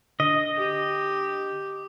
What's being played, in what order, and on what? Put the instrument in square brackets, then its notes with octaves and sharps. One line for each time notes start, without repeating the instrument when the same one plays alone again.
[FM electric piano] D3 [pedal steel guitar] D#5
[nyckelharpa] G4